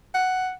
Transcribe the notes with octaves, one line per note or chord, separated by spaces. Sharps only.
F#5